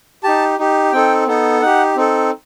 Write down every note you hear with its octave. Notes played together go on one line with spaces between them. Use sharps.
D#4 G4 A5
D#4 G4
C4 D#4 A4 G5
B3 D#4 A4
D#4 G4 F#5
C4 D#4 A4